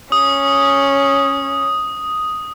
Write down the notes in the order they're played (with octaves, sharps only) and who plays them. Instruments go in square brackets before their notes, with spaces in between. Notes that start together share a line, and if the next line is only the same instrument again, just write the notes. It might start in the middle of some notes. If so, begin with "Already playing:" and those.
[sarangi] C#4 [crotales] D#6